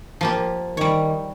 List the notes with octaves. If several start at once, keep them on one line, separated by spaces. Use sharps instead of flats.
F3 A#3 G4
D#3 G3 C#5